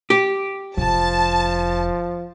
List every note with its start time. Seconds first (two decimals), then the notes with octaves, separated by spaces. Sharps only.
0.10 G4
0.77 F1 F3 A5